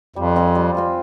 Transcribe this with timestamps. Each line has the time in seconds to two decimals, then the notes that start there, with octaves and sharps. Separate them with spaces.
0.16 F2 G3
0.36 C4 F4 G#4
0.55 G3
0.75 C4 F4 G#4